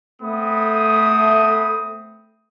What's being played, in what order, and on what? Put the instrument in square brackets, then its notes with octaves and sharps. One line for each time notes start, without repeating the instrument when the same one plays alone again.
[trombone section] A3 [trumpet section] B3 C4 D#6